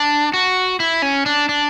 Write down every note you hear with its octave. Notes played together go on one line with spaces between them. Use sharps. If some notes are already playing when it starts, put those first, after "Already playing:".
Already playing: D4
F#4
E4
C#4
D4
D4